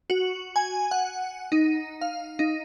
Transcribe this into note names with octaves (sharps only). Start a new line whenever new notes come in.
F#4
G#5
F#5
D#4
F5
D#4